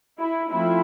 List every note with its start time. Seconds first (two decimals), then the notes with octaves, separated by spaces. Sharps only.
0.19 E4
0.50 F3 A3 C4 E4